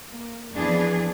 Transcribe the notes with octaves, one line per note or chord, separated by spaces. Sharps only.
A#3
F2 E3 F3 B3 D4 G#4